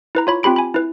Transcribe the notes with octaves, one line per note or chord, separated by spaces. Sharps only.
E4 B4 A#5
F4 C#5 B5
C4 F4 G4 B5 D7
G#5 B5
E4 B4